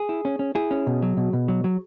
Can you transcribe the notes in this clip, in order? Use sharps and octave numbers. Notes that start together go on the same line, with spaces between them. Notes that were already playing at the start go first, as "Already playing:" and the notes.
Already playing: G#4
E4
C#4
C#4
E4 G#4
C#4
B2
F#3
B2
B2
F#3
F#3